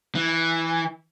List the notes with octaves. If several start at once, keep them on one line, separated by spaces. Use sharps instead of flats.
E3